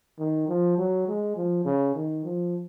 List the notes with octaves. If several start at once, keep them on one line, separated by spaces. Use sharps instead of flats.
D#3
F3
F#3
G#3
F3
C#3
D#3
F3